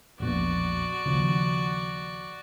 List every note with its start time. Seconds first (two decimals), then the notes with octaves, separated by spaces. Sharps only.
0.20 E1 A#1 B2 F#4 D5
1.06 D#2 C#3 F3